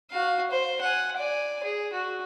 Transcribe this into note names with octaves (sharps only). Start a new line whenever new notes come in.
F#4 F5
C5
F#5 G#5
D5 G#5
G#4
F#4